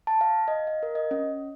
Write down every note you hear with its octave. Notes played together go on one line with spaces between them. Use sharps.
A5
F5
D#5
F5
A#4
D#5
C#4